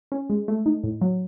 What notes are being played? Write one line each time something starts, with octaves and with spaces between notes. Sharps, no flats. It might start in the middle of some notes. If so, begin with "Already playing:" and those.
C#4
G#3
A3
D#4
A2
F#3